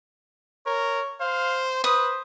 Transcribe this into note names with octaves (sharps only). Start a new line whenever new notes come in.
A#4 C#5
C5 F5
B4 C5 D#6